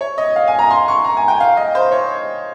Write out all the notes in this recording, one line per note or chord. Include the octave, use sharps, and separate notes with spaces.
C#5
D#5
F5
G#5
A#5
C6
C#6
A#5
G#5
G5
F5
D#5
C5
C#5